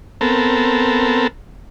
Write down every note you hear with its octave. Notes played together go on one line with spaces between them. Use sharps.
B3 C4 A4 A#4